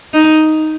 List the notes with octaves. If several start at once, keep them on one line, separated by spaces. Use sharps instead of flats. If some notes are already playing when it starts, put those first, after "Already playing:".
D#4